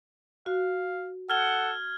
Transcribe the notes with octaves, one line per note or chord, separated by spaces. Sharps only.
F#4 F5
A4 F#5 F6 G#6 G7